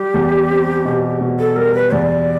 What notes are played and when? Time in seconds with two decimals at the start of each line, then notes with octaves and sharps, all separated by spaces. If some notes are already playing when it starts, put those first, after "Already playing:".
Already playing: G3 G4
0.14 E2
0.50 C4
0.85 B2
1.21 B2
1.39 A4
1.56 G3 A#4
1.74 B4
1.92 E2 D5